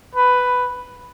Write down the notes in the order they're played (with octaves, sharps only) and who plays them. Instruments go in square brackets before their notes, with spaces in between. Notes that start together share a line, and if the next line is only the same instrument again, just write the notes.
[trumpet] B4